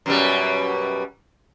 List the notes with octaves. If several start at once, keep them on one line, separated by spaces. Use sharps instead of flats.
F#2 B2 G3